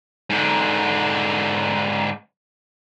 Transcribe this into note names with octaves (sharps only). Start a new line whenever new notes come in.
G#2 D3